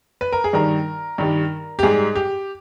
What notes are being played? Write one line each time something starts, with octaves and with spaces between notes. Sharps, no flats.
B4
A#4
G#4
G2 D#3 G3 A#4
G2 D#3 G3
G4
G#2 G3 G#4
G4